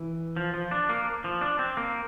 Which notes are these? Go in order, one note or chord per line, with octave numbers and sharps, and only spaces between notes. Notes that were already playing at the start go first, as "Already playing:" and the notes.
Already playing: E3
F3
F3
D4
A#3
F3
D4
C4
A#3